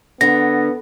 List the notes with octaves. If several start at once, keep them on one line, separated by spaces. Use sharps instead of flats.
D3 B3 A#6